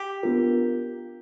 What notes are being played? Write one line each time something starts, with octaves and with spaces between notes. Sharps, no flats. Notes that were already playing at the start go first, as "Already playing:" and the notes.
Already playing: G4
B3 D4 F4 A#4